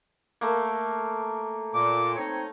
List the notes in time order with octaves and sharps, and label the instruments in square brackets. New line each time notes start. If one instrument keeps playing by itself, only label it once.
[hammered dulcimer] A3 A#3
[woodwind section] A#2 D6
C4 D#4 C#5